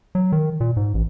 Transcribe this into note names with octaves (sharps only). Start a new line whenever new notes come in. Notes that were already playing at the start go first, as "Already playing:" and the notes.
F#3
D#3
A#2
G#2
A1